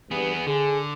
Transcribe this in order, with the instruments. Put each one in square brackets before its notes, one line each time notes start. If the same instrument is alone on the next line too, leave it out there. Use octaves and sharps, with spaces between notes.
[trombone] G2 [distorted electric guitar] B3 G#4
[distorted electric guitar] D3 [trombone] G#4